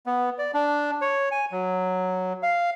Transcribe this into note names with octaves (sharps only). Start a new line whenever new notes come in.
B3
D5
D4
C#5
G#5
F#3
F5